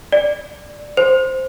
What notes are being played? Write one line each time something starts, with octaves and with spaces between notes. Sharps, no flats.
D5
C5